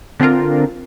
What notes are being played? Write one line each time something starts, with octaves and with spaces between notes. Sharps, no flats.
D3 C4 D4 F4 A#4